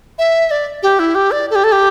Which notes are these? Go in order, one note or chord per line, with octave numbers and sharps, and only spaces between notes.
E5
D5
G4
E4
G4
D5
A4
G4
A4
G4